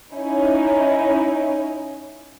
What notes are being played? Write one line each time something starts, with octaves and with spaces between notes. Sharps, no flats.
C#4 D#4 E4